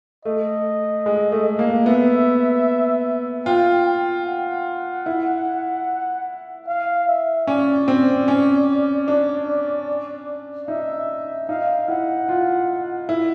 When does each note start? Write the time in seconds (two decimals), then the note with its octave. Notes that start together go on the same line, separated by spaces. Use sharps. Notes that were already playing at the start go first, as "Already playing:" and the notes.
0.25 A3 D#5
1.06 G#3
1.32 A3
1.59 A#3
1.86 B3 E5
3.46 F4 G5
3.86 G5
4.26 F#5
5.06 E4
6.67 F5
7.07 E5
7.47 C#4 D5
7.88 C4
8.28 C#4
9.08 D4
10.68 D#4 E5
11.48 D#4 F5
11.88 E4 F#5
12.29 F4
13.09 E4